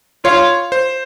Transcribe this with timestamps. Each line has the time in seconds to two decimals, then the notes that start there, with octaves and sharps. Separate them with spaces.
0.25 F4 C#5
0.72 C5